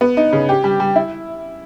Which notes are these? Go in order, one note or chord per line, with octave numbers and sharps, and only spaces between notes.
B3
D#4
C#3
G4
G3
G3
E4